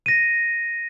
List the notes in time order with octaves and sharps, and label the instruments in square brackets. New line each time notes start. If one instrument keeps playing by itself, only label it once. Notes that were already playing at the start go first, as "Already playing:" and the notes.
[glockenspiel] A#6 D#7